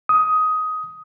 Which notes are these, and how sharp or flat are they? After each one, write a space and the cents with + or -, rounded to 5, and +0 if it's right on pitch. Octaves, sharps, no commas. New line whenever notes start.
D#6 +15